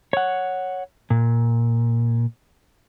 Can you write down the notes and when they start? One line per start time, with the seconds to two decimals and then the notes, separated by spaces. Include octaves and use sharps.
0.13 C#5 F#5
1.10 A#2